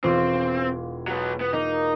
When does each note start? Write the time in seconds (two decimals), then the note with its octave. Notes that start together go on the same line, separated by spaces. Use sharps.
0.04 E1 C4 F4 C6
1.08 F#3 B3
1.41 B3
1.53 A#3 D#4